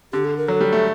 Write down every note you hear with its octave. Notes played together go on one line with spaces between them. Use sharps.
D3 G4
A4
A#4
F#3 A4
G3
A3